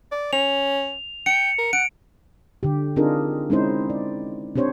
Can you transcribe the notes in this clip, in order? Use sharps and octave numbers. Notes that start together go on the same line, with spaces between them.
D5
C#4 F7
G5 C#7
A#4
F#5 D7
D3 G4
C4 D4 D#4 F4 G#4 A#4
G#3 C4 C#4 D#4 E4 C5
D5
C4 D4 G4 C5 C#5